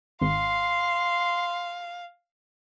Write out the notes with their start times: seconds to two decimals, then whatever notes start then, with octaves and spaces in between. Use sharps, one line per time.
0.22 G#1 F5 C6